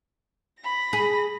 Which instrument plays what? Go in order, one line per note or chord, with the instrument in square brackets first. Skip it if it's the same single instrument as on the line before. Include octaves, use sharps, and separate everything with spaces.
[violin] B5 A#6
[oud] G#4